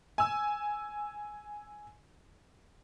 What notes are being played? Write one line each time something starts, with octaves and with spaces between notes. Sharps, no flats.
G#5 E6